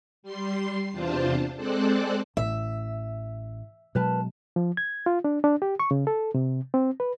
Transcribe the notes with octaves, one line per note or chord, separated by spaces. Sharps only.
G3 C6 C7
E2 C3 D4 F4 C5 A5
G#3 C4 A4 C5 D5 F#6
A1 E5
B2 F#3 G#3 A#4 B4 A5
F3
G#6
F4
D4
D4
G4
C#6
C#3
A4
C3
C4
B4